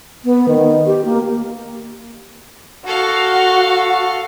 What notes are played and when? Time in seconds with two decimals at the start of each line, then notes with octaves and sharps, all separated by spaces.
0.24 B3
0.48 D#3
0.86 G4
1.05 A#3
2.87 F#4 A4 F5